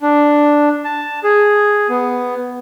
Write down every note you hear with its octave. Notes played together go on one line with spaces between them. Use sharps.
D4
A5
G#4
B3